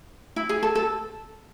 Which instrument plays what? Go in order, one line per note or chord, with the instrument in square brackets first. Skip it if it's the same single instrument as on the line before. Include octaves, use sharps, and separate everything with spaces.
[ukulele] E4
G#4
A4
A4